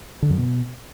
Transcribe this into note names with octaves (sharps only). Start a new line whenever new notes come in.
D3
F#2
B2